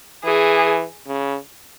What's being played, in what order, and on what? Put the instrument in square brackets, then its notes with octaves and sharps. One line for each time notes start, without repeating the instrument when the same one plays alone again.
[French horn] E3 [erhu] G#4
[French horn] C#3